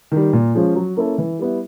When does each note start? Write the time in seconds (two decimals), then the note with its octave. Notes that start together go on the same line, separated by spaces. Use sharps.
0.12 D#3 G3
0.33 A#2
0.55 F3 G#3 C#4 F4
0.76 F#3
0.97 A#3 C#4 E4 A4
1.18 E3
1.39 G3 B3 E4